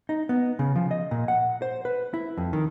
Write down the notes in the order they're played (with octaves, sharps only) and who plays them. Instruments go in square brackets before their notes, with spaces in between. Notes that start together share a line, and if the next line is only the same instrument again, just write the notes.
[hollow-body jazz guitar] D#4
B3
C#3
F3
D#5
A#2
F#5
C5
B4
E4
F2
D#3